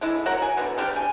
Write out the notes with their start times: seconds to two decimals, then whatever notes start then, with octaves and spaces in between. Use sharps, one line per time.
0.01 D3 G#3 E4
0.26 F#4 A#4 C#5 F#5
0.42 G#5
0.57 B2 D3
0.78 C#3 G3 D4 G4
0.96 G#5